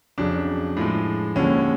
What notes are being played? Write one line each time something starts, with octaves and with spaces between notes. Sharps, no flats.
F2 C#3 F#3 D4
A2 F3 G#3
D#2 D3 F3 G#3 C#4